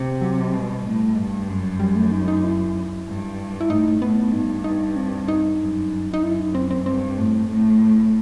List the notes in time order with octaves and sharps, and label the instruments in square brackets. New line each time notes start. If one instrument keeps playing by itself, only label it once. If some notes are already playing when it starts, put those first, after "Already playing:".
Already playing: [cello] C3
[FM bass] F#3
[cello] B2 [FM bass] G3
[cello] A2
G2
F#2
[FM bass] G3
A3
D#4
D#4
E4
[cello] G2
[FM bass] E4
[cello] A2 [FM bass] D#4
[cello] A2 [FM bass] B3
[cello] G2 [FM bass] D#4
[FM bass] D#4
C4
D#4
[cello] F#2
[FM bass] D#4
[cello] F#2 [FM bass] E4
[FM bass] D#4
C4
C4
[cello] G2 [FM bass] C4
[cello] A2
[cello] A2 [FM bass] A3